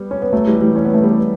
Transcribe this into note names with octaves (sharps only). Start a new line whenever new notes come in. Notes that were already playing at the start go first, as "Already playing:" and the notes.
Already playing: G3 B3
C#4
B3
F#3 A3
E3 G3
E3 G3
C#4
B3
A3
G3 B3